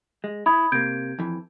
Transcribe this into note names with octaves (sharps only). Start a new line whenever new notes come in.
G#3
E4 B5 D#6 G#6
C3 A#3 G6 G#6 D7
F2 E3